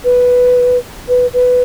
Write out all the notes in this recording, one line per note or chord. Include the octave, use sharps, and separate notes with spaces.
B4
B4
B4